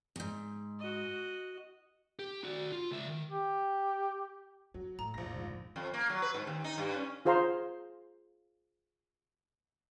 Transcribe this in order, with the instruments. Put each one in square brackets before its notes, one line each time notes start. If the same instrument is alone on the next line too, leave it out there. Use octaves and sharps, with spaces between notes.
[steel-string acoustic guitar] E2 G#2
[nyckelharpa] F#4 D#5
[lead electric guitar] G4
F#4 D5
F4
C#2 E5
D#3
[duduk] G4
[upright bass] F2 [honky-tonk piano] F#3
[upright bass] A1 [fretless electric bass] A2 [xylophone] A#5
[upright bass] E1 [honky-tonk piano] A#1 A#6
[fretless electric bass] G1 G#2 F3
[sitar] F2
A#3
F#3
B4
G#2
D#2
D#4
G2
C#4
[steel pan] F4 G#4 C5 F5 A#5 C6